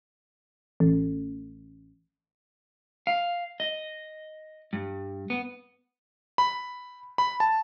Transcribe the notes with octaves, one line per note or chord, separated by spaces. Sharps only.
A1
F5
D#5
G2
B3
B5
B5
A5